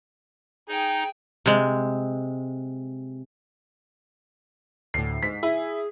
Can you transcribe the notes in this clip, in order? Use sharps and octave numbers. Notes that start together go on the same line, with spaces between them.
D#4 G#4 G5
C3 G#3
D2 A2 C7
G#2 B6
E4 G#4